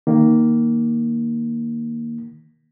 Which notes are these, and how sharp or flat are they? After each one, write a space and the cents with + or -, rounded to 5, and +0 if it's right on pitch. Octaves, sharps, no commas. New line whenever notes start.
D#3 +0 A#3 +0